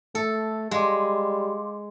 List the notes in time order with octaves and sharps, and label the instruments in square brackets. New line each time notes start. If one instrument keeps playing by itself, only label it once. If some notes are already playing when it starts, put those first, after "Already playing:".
[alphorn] A3 [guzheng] A4
[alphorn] G3 [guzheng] G#3 [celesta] F5 C6 D6